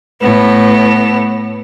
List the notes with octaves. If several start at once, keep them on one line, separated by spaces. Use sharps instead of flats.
A2 B3